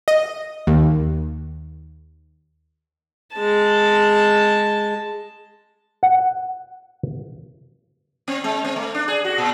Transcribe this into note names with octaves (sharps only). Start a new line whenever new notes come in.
D#5
D#2
G#3 A5
F#5
C4
G#3
C4
A3
D4
G#4
F#4
A#2